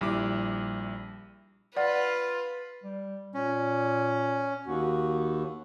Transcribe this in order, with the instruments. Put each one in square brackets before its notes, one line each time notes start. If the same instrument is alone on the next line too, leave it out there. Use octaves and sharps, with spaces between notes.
[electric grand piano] A#1 G3 E4 D6
[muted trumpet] F4 [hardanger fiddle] B4 [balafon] D5 F#5
[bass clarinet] G3
[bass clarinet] A#2 [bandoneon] C#4
[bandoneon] D#2 [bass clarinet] F#4